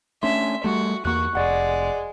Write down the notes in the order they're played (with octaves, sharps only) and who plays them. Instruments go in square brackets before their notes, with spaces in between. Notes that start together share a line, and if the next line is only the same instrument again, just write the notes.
[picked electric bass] A3 C#4 D4 [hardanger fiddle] E5 [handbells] C6
[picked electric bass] G3 A3 [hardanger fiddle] F#4
[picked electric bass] E2 A#3 [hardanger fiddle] F#4 [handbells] C#6 F#6
[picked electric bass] F1 [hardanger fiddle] G#3 [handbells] D5 F#5